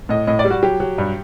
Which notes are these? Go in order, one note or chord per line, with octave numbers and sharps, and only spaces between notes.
A2 D#5
A2 D#5
D5
G3
F#4
F#3 G4
F#3
G2